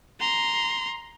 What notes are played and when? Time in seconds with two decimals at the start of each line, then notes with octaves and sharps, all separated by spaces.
0.20 A#5 C6